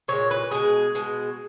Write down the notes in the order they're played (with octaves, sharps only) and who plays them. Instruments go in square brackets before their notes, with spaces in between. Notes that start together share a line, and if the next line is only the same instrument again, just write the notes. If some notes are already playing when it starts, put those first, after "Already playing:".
[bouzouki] A#2 G#3 C#5
B4
B2 G#3 G#4
B2 G#3